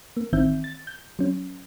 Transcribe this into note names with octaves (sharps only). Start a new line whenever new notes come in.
A#3
A1 D#3 E3 C4 E5 G6
A6
G6
F#3 C#4